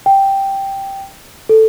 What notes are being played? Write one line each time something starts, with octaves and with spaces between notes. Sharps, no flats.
G5
A4